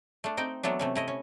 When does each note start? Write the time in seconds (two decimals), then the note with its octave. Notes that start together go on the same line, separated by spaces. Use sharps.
0.24 A3 D4
0.37 C4 D#4 G5
0.63 E3 F#3 A3 B3 D4
0.79 C3 A3 C#4
0.95 A3 E4 D#5
1.08 C#4